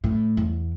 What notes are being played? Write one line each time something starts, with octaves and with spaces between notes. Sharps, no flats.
A2
E2